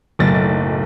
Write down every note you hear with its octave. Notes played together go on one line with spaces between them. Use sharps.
F#1 B1 A2 A6